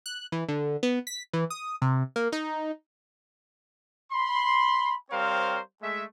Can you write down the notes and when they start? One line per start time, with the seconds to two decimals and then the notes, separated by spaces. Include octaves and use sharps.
0.06 F#6
0.32 E3
0.48 D3
0.83 B3
1.07 B6
1.33 E3
1.50 D#6
1.82 C3
2.16 A#3
2.32 D#4
4.12 B5 C6
5.11 G3 C4 A#4 C5 C#5 F5
5.82 G#3 A3 E5